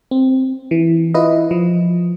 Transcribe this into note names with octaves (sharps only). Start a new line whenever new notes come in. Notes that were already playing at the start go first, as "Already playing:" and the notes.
C4
E3
E4 F4 B4 D#5
F3